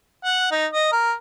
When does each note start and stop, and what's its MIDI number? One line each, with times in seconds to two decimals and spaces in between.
0.24 0.47 78
0.51 0.66 63
0.73 0.88 75
0.92 1.13 70